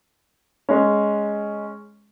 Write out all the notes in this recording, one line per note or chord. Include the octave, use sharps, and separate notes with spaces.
G#3 C#4